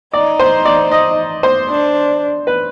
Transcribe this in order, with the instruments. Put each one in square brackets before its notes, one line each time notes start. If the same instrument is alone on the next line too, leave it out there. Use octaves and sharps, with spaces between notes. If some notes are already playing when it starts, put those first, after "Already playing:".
[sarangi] D#4 [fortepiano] D5
[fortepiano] C5
D5
D#5
C5
[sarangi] D4
[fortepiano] B4